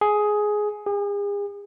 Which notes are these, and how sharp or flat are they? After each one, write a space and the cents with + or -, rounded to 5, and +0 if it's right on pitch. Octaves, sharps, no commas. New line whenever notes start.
G#4 +10
G#4 -40